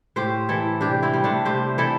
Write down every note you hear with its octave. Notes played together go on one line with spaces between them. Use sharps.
A2 G4 C5
E3 E4 A4
C3 D4 G4
C4 E4
G3
A3 D4
C3 G4 C5
E3 E4 A4